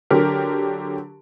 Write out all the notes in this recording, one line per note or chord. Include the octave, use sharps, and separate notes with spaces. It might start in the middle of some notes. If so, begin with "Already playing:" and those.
D3 F#3 G4 A#4